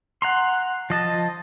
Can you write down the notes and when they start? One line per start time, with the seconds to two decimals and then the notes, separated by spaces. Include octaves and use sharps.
0.22 F#5 A#5 C6
0.90 F3 D#5 A5